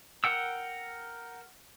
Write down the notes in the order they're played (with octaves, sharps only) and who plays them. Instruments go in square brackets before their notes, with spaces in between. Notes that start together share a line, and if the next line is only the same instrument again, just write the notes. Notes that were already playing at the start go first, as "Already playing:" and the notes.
[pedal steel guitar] A#4 F#5 G5 E6